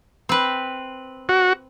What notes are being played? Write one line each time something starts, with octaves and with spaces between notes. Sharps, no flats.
C4 B4
F#4